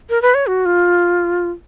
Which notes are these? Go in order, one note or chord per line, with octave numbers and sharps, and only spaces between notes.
A#4
B4
C#5
F#4
F4